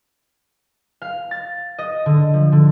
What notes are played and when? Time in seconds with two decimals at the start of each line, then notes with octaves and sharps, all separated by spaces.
1.02 F5
1.31 A6
1.79 D#5
2.06 D3
2.33 F3
2.52 D3